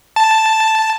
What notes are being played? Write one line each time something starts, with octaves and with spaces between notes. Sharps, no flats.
A5